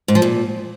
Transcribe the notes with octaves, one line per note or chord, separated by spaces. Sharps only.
G#2
F3
A#2